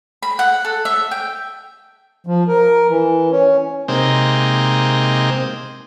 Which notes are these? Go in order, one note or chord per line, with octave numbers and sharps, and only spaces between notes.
B5
F#5
A4
E5
G5
F3
A#4
E3
C#4
C3 G#3 A#3 C4 D#4